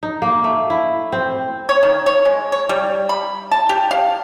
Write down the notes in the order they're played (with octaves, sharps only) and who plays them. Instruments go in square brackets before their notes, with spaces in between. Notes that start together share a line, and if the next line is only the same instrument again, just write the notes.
[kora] D#4
A#3
A3
E4
C4
[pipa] C#5
D#3
C#5
G#3
C#5
G3
B5
A5
G4
F5